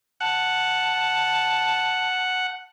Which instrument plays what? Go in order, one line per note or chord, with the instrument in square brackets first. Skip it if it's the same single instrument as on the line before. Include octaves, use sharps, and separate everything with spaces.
[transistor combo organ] F#5 [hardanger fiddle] A5